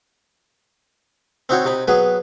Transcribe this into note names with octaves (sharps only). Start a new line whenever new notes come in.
C4 D#4 E4 F#4 C5 C#5
C3 D#4 B5
F#3 B3 G#4 B4